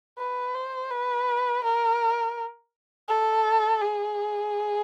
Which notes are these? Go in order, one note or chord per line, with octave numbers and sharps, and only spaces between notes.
B4
C5
B4
A#4
A4
G#4